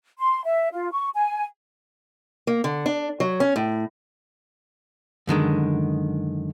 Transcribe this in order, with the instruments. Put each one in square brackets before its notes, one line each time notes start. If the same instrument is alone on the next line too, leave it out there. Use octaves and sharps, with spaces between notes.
[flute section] C6
E5
F4
C#6
G#5
[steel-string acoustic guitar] A#3
D3
D4
F#3
C#4
A2
[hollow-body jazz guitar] F#2 D3 D#3 G#3